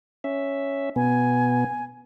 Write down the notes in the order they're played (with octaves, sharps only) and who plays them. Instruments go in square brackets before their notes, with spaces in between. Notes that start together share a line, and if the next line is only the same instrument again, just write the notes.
[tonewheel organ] C#4 E5
[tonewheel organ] B2 B3 [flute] G#5